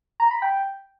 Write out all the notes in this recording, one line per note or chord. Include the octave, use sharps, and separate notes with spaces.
A#5
B5
G5